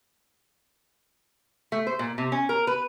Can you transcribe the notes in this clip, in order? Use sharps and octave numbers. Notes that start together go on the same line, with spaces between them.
A3
C5
A#2
C3
C#4
A#4
B4